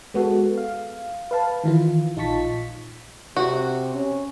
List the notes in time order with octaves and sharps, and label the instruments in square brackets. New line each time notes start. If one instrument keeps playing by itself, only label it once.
[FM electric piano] G#3 B3 F#4 A4
F5
B4 F5 A5
D#3 E3 F4
A#1 D#4 F4 A5 C#6 B6
[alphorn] C3 [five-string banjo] F#4
[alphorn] C#4